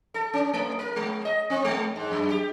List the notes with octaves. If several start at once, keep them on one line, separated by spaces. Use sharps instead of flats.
A4
C#4
A3
A#4
G#3
D#5
C4
G#3
G#2
F#2
G4